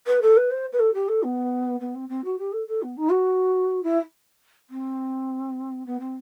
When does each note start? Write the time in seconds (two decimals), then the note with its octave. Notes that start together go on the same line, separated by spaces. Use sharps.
0.07 B4
0.21 A4
0.36 B4
0.50 C5
0.72 B4
0.79 A4
0.93 G4
1.08 A4
1.23 B3
1.80 B3
1.94 C4
2.09 C4
2.24 F#4
2.38 G4
2.52 A4
2.67 A4
2.82 B3
2.97 D#4
3.11 F#4
3.83 E4
4.70 C4
5.86 B3
5.99 C4